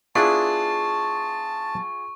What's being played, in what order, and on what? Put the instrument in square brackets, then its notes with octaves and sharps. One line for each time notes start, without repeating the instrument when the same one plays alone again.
[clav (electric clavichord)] B3 D4 E4 [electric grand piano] F4 G#4 [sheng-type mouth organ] A5 [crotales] C#6